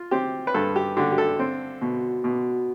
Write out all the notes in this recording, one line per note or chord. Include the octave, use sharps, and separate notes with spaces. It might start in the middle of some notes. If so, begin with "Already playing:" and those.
Already playing: F4
C4 G4
B4
G2 A4
G4
D3 G4
G4
A4
C4
B2
B2